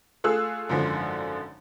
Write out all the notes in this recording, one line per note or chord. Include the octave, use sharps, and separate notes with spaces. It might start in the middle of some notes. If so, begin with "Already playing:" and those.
A3 F4 G#4 E6 F#6
G#1 F#2 D3 F3